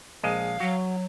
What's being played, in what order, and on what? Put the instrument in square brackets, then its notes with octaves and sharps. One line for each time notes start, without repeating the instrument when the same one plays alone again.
[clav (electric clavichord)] A#1 G#3 D#5 [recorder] F5
[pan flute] F#3 [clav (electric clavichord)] F#4